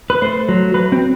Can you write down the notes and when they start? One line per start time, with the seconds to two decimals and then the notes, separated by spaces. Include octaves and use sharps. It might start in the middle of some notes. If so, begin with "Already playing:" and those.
0.10 B4
0.22 A3 C5
0.49 F#3
0.74 F#3 B4
0.92 C4